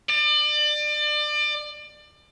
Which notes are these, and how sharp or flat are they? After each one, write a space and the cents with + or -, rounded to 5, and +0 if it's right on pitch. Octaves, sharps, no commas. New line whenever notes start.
D5 +30